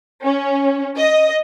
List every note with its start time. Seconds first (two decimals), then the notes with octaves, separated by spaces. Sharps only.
0.24 C#4
0.97 D#5